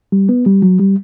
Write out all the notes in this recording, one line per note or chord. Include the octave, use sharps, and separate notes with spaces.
G3
B3
G3
F#3
G3